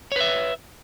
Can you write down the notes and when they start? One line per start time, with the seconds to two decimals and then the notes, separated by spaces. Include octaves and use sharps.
0.12 C#5
0.16 B4
0.20 E5